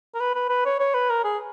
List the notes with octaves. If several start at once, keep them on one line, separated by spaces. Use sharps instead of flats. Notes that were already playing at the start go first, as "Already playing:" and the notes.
A#4
B4
B4
B4
C#5
C#5
B4
A#4
G#4